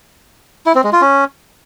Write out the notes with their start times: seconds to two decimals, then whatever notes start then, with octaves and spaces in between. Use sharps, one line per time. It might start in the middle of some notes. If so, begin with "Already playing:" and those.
0.66 E4
0.75 C4
0.84 G#3
0.93 F4
1.01 C#4